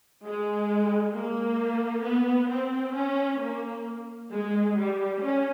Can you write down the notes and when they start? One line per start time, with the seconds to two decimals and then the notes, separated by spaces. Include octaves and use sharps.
0.24 G#3
1.14 A#3
2.05 B3
2.50 C4
2.95 C#4
3.40 A#3
4.31 G#3
4.76 G3
5.21 C#4